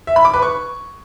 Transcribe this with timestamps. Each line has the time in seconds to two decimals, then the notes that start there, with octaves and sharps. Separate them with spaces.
0.07 E5
0.16 B5
0.25 D6
0.34 B4
0.42 C#6